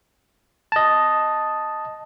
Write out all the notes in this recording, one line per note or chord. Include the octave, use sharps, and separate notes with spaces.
D#5 A5